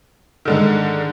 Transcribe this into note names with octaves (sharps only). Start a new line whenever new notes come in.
G#2 D3 D#3